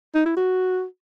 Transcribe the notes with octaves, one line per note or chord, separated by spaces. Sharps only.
D#4
E4
F#4